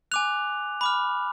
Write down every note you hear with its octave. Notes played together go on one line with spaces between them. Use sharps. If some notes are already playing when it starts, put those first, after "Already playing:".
G#5 D6 F#6 F7
B5 D6 F6